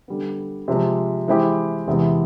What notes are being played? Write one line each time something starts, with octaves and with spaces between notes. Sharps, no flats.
D3 G3 B3
C3 F3 G#3
E3 G#3 C4 E4 G4
E2 C3 E3 G#3 B3